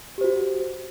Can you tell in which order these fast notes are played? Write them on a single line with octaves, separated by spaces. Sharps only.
G4 C5 F#4